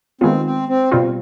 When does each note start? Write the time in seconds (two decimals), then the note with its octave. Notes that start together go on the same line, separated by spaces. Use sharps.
0.21 D#3 G#3 B3 C4 F4
0.45 C4
0.68 C4
0.92 B2 G3 C4 F4